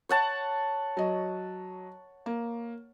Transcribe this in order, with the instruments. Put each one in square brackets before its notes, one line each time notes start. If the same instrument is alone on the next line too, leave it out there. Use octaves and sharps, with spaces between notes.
[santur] C#5 F#5 A5
[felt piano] F#3 D#5
A#3